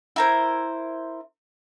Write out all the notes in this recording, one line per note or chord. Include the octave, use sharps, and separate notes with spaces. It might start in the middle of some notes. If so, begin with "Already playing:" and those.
E4 A#4 C5